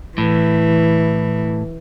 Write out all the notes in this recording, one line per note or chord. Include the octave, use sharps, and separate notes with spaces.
A2 E3